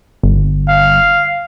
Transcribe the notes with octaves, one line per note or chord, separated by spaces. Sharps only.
G1
F5